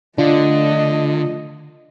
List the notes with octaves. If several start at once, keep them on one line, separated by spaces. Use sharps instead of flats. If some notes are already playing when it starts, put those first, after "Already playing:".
D3 A3 D4 F4 D#5